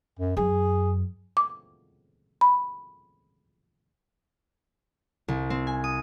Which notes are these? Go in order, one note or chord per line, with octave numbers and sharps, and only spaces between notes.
F#2
F#2 G#4
D6
B5
C2
C4
G#5
D#6